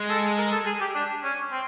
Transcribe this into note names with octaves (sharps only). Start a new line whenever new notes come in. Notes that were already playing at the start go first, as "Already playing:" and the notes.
Already playing: G#3
A4
A#4
A4
G#4
G4
D4
C#4
C4